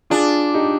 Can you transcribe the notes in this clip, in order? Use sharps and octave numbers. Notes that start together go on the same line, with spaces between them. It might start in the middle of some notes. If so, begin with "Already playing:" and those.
D4 F4 G#4
D#4 G4